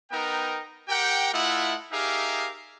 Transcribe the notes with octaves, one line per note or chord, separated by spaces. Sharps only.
B3 D#4 A#4 G5
G4 A#4 F#5 G5
A3 E4 F4 D#5 F#5
D#4 G4 G#4 A#4 E5 F5